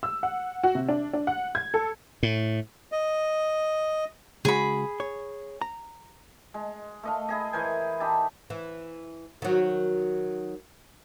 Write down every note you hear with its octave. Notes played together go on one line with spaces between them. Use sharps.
E6
F#5
F#4
C3
D4
D4
F#5
G#6
A4
A2
D#5
C#3 G#3 F#4 G#4 B5
C#5
A#5
G#3
A3 D#5 F5
E4 G#4 D#5
E3 A#4 C5 G#5
D#4 G4 E5 A5
E3
D#3 F#3